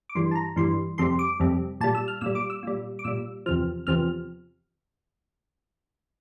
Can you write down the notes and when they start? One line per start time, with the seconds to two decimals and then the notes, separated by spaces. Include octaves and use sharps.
0.09 D6
0.15 G2 E3 G3 C6
0.31 A5
0.35 A#5
0.56 G2 E3 G3 C6
0.98 F2 C3 G3 C6
1.19 D6
1.40 F2 C3 G3
1.81 A#2 G3 A5
1.95 E6
2.08 F6
2.21 A#2 G3 E6
2.35 D6
2.50 E6
2.63 A#2 G3
2.99 D6
3.04 A#2 G3 E6
3.46 E2 C3 F3 F6
3.87 E2 C3 F3 F6